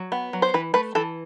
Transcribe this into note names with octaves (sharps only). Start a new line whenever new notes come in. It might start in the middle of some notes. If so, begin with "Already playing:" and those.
Already playing: F#3
B3
F#3
C5
E3 B4
A3 B4
E3 A4